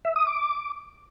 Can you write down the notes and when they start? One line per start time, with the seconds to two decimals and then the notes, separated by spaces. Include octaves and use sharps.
0.05 E5
0.16 D#6
0.27 D6